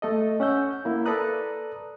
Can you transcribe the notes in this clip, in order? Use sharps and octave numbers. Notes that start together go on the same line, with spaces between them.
A3 A4 D#5
C#4 F#5 E6 G6
A#3 E4
A4 B4 D5 A#5 D#6 F#6